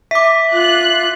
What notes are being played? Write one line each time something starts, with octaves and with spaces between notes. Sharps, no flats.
E5 D6 B6
F4 F#6